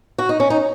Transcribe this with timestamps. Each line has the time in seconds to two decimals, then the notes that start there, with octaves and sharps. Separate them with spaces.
0.18 F#4
0.29 D#4
0.40 C#4
0.50 D#4